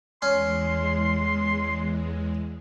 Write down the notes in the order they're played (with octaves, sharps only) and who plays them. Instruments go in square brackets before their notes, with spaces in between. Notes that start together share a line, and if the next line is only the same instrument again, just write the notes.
[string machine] E2 G#3 [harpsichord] C#4 [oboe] C6